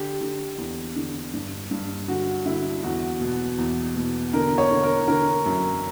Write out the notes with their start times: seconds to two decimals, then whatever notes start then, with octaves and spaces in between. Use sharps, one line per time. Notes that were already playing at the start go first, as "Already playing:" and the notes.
Already playing: D3 G4
0.21 D3
0.58 E2
0.96 D3
1.33 G2
1.71 G2
2.08 D3 F#4
2.46 D3 E4
2.83 E2 F#4
3.21 B2
3.58 E2
3.96 B2
4.33 D3 A#4
4.58 C#5
4.71 D3
4.83 A#4
5.08 D3 A#4
5.46 F#2